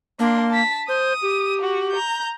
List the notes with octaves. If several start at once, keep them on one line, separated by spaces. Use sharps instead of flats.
A#3 D4 C6
A5 B6
C5 D#6
G4
F#4
A#5 G6